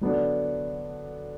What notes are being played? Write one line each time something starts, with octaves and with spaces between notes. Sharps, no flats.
D3 F#3 B3 D4